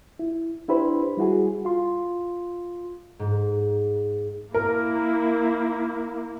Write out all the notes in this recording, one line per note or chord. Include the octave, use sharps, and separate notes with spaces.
E4
D4 E4 G4 B4 C5 B5
G3 E4 F#4 G#4
F4 C6
G#2
A#3 E4 A#4